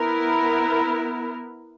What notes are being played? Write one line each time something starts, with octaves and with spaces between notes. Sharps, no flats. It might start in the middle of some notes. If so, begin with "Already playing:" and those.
Already playing: B3 E4 A#4